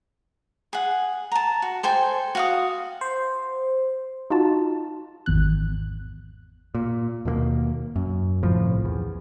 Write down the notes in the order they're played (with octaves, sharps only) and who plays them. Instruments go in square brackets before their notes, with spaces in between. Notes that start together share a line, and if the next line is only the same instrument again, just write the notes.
[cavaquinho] G#4 F#5
A5 A#5
F#4
A4 C5 G5 G#5
F#4 F5 D#6
[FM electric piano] C5
[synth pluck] D#4 F4 F#4 A5
G#1 E2 F#6
[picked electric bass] A#2
D#2 B2 G#3 A#3
F#2
G1 C2 A2 F3
E2